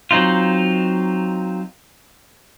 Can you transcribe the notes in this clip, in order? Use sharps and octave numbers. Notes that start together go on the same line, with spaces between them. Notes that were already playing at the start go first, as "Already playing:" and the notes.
F#3 C4 D#4 F4